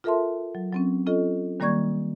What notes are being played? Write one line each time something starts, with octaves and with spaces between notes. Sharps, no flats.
F4 A4 A#4 E5 A5 C6
F#3
F#3 C4 C#4
C#4 F4 A4 D#5
D#3 G3 A#3 D5 C#6 G#6